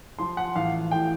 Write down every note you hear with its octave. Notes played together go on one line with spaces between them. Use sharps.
F3 C6
F#5
A1 F5
A2 G5